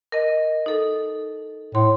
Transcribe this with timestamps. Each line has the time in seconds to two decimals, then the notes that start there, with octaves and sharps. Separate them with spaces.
0.12 A#4 D#5
0.66 D#4 A4
1.75 A2 C6